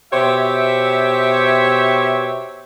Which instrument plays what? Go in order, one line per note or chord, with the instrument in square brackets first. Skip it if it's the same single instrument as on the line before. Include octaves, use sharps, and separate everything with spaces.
[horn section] B2 G4 C5 C#5 E5